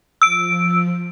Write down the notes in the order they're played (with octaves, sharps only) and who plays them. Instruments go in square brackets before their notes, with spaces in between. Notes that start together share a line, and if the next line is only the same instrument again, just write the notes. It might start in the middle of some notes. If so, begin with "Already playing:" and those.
[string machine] F3 [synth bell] E6 D7